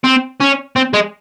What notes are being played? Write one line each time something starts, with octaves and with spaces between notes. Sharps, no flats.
C4
C#4
C4
G#3